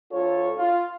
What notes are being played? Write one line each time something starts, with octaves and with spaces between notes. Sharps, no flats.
D2 F4 A4 C#5
F4